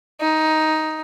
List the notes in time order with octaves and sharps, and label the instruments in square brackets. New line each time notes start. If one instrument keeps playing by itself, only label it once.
[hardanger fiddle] D#4